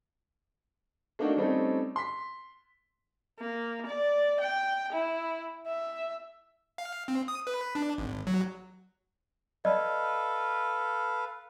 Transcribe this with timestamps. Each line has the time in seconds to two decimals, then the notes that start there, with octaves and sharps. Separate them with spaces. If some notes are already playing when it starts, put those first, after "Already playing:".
1.19 A3 A#3 D4 D#4 F#4
1.37 G3 A3 C4 C#4 D#4 A4
1.96 C6 B6
3.39 A#3
3.86 D5
4.40 G5
4.92 E4
5.66 E5
6.78 F5
7.08 C4
7.28 D#6
7.47 B4
7.75 D4
7.98 G#1
8.27 F#3
9.65 A4 B4 D5 D#5 F5